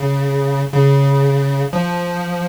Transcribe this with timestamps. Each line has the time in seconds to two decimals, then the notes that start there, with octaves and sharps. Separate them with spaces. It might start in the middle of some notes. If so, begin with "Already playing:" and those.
Already playing: C#3
0.73 C#3
1.73 F3